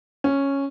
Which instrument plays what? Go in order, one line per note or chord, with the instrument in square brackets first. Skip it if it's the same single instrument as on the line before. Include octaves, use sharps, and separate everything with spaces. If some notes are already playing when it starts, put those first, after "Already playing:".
[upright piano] C#4